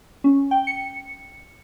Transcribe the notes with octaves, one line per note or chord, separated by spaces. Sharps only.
C#4
G5
C#7